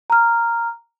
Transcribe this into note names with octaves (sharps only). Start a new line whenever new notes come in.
A#5 F6